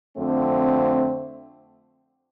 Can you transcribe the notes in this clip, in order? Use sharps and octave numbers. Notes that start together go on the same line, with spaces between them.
F2 D3 A3 C4